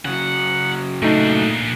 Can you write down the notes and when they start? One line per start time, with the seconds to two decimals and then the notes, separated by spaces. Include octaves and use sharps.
0.05 C#3 F#3 F#5
1.02 A#2 A3 D4 D#4